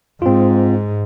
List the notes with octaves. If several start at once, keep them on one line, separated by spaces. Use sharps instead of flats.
G#2 C4 F4